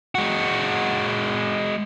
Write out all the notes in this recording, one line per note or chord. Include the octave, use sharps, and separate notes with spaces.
G#3 F#4